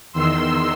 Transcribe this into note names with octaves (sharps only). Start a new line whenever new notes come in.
E2 D#3 C6 E6